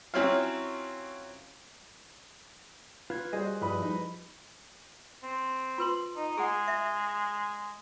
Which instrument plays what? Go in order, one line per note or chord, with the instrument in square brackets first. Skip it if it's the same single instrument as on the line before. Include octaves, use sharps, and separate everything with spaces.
[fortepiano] F#3 C4 C#4 E4 F4 F5
[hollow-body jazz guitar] F4 [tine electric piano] B4 G#6
[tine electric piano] G3 [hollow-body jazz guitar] F#4 C5 D#5 [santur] G#4
[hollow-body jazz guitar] G2 [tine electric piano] F3 G3 [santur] E4 B4 D#5
[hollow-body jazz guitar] D#4
[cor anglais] C4
[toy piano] F4 B4 C6
[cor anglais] D#4
[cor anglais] G#3 [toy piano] G#4 F#5
[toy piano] E5